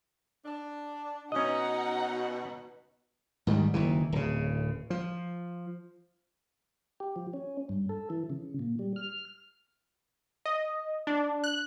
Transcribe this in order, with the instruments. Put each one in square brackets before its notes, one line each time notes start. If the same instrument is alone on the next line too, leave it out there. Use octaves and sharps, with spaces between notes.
[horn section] D4
[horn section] B2 [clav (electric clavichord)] C#4 D#5 [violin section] D#4 F#5
[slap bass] G#2 D#3 E3 G3
F#1 D#3 E3
D1 C#3
F3
[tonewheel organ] G4
F3
C#4
G2
A4
E3
C#3
A#2
G3
F6
[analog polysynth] D#5
D4
F#6